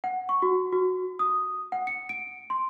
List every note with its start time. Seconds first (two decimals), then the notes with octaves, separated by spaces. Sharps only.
0.04 F#5
0.29 C#6
0.42 F#4
0.72 F#4
1.19 D#6
1.72 F#5
1.87 C#7
2.09 D7
2.50 C6